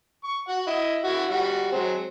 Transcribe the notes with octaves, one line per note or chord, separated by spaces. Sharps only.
C#6
F#4 F#5
E4 D#5
E4 F#4
G3 F#4
F#3 G#3 C4